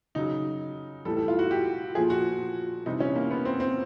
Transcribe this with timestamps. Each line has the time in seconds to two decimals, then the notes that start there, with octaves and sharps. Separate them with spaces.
0.15 C#3 F#3 D#4
1.05 A2 E3 G3 A4
1.17 A4
1.28 F4
1.39 F#4
1.51 G4
1.95 A#2 F3 G#4
2.10 F#4
2.86 C3 E3 G3 D#4
3.00 C#4
3.15 A#3
3.31 B3
3.45 C4
3.60 C4